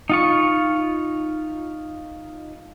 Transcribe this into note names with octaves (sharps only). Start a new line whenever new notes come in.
D#4 F4 C#6